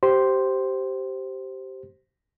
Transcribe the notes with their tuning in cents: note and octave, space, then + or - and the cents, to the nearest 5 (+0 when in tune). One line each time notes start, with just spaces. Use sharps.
G4 -20 C5 +0 C6 +0